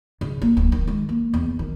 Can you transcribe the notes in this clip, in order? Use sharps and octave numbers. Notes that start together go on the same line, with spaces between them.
C#3
A#3
D1
D#3
G#3
A#3
E2
D#3